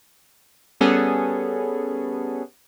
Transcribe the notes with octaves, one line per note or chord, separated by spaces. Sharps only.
G3 B3 C#4 G#4 A4